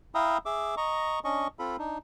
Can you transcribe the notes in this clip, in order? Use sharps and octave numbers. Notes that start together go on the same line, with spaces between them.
E4 E5 F5 G5 A#5 D#6
G#4 E5 D6
D#5 A#5 C#6
C#4 D4 D#5 C#6
C4 F4 A4 B5
D4 D#4